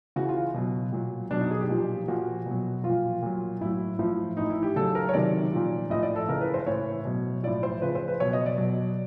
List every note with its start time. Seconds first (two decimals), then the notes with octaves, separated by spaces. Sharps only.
0.16 C#3 E3 F#4
0.29 F4
0.54 B2 F#3
0.92 A#2 F#3
1.31 B2 F#3 D4
1.41 D#4
1.51 G#4
1.61 G4
1.69 A#2 F3
2.08 A#2 F3 F#4
2.46 B2 F#3
2.84 F3 F4
2.89 A#2
3.22 A#2 F#3
3.61 A2 F#3 E4
3.99 A2 F3
4.37 A2 E3 D#4
4.50 E4
4.63 G4
4.76 C#3 F#3 A4
4.95 A#4
5.09 C#5
5.14 C3 D#3 F#3 D5
5.53 A#2 F3
5.90 A2 F3 D#5
6.03 D5
6.16 A4
6.28 C#3 E3 A#4
6.41 B4
6.54 C5
6.66 A2 E3 C#5
7.05 B2 F#3
7.43 A2 F3 D5
7.63 C5
7.81 C#3 F3 B4
7.95 C5
8.08 B4
8.20 B2 F#3 C#5
8.33 D#5
8.46 D5
8.58 B2 F#3